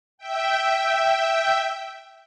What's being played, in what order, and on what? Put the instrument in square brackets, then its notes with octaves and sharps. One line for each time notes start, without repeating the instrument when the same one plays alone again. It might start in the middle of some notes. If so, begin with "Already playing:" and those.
[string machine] E5 G5